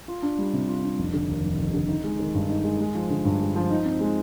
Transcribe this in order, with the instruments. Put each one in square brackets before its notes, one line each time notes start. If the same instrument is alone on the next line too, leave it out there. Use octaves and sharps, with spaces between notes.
[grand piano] F4
D4
G3
C3
F4
D4
F1
D3
D#2
F1
F1
D3
D#4
G#3
D#3
G2
D#4
G#3
G#3
F3
D3
G2
G#3
F3
D#4
C4
G#3